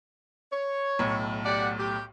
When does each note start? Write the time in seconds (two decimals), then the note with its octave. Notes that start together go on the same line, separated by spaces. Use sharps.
0.52 C#5
0.99 B1 A2
1.45 G4 D5 F#5
1.79 G4